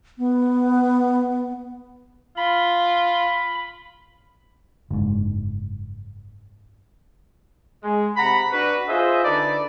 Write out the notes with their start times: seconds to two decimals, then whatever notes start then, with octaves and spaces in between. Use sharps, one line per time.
0.18 B3
2.37 F4 B5
4.90 F#1 G#2
7.84 G#3
8.17 C3 F#5 A#5 B5
8.52 D4 F#4 B4
8.89 F4 G#4 C5 D#5 E5
9.24 D3 D#4 A4 B4 D5